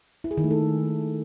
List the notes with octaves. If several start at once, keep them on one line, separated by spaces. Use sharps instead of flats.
E4
G#4
D#3
A3
A4